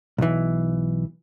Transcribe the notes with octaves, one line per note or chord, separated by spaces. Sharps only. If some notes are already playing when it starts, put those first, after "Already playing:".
B1 E3